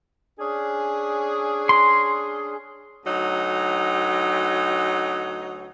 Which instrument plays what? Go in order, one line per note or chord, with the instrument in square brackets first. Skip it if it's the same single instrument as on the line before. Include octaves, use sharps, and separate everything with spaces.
[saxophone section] C#4 D4 G#4
[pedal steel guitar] C6
[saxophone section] D2 F#3 D#4